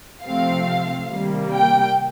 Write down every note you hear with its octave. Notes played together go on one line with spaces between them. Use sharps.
C3 F3 A3 C4 F5
C3 D#3 G3 A#3
G5